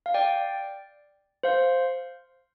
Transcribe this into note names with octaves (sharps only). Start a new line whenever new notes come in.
F5
D5 G5
C5 F5